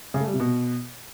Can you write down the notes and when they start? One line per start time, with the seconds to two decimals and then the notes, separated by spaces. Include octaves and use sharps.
0.14 C#3
0.20 A3
0.27 G3
0.33 C3
0.40 B2